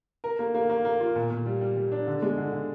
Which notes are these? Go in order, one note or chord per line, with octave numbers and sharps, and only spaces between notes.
A#4
A#3
A#3
A#3
A#3
F4
A#2
A#2
G3
G3
G3
D4
D3
G#3
D3
D3